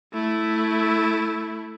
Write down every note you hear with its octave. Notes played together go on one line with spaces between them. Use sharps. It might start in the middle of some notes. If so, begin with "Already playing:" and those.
A3 E4